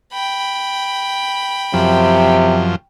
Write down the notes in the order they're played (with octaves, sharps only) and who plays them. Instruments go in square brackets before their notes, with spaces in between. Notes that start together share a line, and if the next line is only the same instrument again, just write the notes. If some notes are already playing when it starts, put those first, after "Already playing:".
[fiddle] G5 B5
[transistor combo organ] F#2 F3 [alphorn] C3